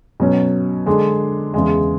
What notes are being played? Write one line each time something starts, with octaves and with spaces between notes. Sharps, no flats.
B2 F#3 C#4
D3 G#3 D4
E2 C#3 G#3